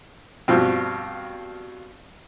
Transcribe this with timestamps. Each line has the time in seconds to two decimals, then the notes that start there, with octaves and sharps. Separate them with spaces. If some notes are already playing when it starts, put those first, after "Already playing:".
0.48 G2 B2 F3 C4